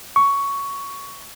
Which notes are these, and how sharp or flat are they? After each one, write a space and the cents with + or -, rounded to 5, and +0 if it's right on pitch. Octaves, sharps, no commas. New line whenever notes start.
C#6 +10